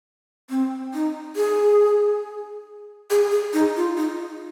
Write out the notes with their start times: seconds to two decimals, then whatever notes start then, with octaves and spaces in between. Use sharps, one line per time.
0.50 C4
0.94 D#4
1.36 G#4
3.10 G#4
3.32 G#4
3.53 D#4
3.76 F4
3.97 D#4